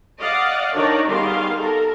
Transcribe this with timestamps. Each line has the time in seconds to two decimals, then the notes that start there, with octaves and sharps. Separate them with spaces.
0.19 D5 D#5 F5 F#5
0.75 D#3 D4 D#4 C#5 D5
1.08 D#3 G3 B3 G#4 F5 C6
1.59 A4 A#4